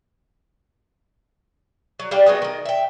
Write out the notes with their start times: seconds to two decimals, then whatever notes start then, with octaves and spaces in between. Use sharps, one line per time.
2.00 F#3
2.11 G3 D4 F5 G5
2.26 F#3 G#3 A3 B3
2.42 D#3 D#5
2.65 E5 G5